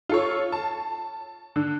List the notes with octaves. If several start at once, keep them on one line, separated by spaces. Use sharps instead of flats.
F4 A4 C#5
A5
D3